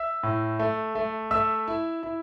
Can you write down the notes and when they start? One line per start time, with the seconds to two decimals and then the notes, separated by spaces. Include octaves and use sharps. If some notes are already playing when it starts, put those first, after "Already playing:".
Already playing: E5 E6
0.23 A2
0.59 A3
0.95 A3
1.31 A3 E5 E6
1.68 E4
2.03 E4